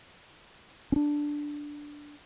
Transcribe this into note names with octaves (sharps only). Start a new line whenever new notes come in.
C#4 D4